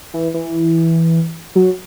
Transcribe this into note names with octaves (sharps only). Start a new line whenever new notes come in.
E3
E3
F#3